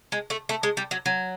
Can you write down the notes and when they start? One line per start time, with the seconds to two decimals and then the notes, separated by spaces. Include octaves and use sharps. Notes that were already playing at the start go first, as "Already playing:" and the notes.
0.12 G#3
0.30 A3
0.49 A3
0.63 G#3
0.77 G3
0.91 F#3
1.06 F#3